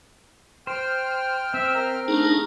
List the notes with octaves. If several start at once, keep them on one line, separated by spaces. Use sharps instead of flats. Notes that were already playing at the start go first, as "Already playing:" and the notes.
C5 G5 F6
C4 E5
A#4
A3 D4 D#4 G#4 A#5